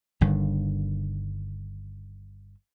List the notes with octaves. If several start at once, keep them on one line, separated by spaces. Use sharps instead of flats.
G1 G2 D3 D#3